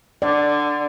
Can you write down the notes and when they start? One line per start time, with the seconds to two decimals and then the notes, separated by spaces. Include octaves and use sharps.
0.22 D3 D5